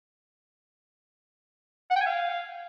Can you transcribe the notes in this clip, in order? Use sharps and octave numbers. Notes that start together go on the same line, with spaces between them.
F#5
G5
G#5
F5